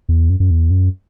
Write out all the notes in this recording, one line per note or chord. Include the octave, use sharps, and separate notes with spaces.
E2
F#2
F#2
E2
F#2